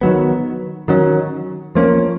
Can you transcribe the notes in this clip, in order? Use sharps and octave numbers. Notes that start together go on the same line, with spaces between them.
D#3 F#3 B3
D#3 F#3 C#4
F3 A#3 C#4